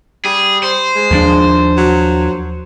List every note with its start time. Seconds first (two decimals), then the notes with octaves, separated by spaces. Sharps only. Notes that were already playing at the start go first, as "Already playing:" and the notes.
0.25 G3 G#4
0.63 C5
0.96 G#3
1.11 D#2 F3 D4
1.77 F#3